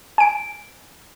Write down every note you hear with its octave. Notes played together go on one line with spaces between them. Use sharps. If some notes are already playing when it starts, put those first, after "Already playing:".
G#5 D7